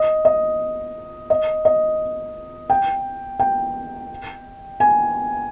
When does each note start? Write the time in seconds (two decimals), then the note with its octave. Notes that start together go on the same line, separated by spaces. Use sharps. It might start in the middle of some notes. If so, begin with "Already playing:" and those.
Already playing: D#5
0.25 D#5
1.30 D#5
1.65 D#5
2.70 G5
3.39 G5
4.80 G#5